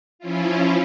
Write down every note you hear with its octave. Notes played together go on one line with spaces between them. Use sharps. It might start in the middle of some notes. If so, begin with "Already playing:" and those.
F3 C#4 E4 F4